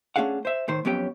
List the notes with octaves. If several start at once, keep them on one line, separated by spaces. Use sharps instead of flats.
A3 C#4 D4 G#4 F5 F#5
C5 E5
A2 D#3 C5
F2 F#3 B3 C#4 G4 G5